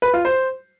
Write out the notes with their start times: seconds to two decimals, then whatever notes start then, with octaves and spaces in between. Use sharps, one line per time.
0.02 B4
0.13 F4
0.25 C5